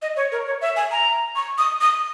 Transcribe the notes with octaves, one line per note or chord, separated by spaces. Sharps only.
D#5
C#5
A#4
C#5
E5
G#5
A#5
C#6
D#6
D#6